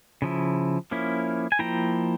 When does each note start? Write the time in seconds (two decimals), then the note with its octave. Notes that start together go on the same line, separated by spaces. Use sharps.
0.22 C#3 F3 E4
0.91 F3 A#3 C#4 E4
1.52 G#5
1.59 F3 A#3 E4 G5 A#5